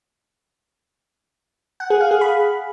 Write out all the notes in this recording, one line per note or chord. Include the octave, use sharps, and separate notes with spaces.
F#5
G#4
F5
G#4
B5